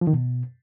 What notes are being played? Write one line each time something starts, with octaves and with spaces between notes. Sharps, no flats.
F3
D#3
B2